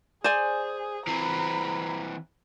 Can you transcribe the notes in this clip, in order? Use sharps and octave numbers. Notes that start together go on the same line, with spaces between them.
G#4 C5 D5 G#5
E3 C4 A#5 B5